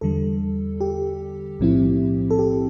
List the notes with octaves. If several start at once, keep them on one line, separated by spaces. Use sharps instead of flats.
E2 D3 G3 A4
G4
B1 A2 F3 C4 E4
A4
G4